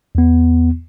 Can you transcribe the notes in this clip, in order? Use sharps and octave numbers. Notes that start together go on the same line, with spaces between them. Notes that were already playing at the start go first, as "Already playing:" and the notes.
E2 B3